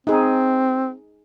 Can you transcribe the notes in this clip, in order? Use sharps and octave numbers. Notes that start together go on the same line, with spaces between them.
C4 D#4 G#4